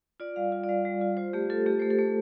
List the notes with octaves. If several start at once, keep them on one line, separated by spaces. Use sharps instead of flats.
F4 D5
G3 F5
F4
D5
G3 F5
G3
F4
F4 C5
A3 G4
F4 A4
A3 G4
A3 C5
A4
A3